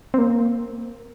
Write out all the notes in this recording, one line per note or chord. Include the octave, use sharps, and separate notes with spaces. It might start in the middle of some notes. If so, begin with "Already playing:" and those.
C4
A#3